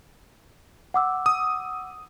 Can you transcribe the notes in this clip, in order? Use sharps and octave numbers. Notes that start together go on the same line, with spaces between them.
F#5 D6 E6
D#6